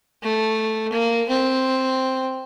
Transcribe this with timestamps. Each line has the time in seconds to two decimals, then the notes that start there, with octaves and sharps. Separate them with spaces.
0.23 A3
0.93 A#3
1.29 C4